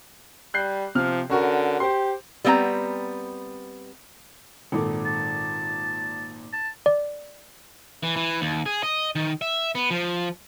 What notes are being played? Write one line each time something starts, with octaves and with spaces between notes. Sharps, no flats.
G3 F#6 G6 C7
C3 F3 F6
D3 C#4 F#4 A#4
G4 C5 C6
G3 B3 C4 F5 A#5
G#1 A#2 A4
A5
A5
D5
E3
E3
D#2
G#4
D#5
D#3
E5
B3
F3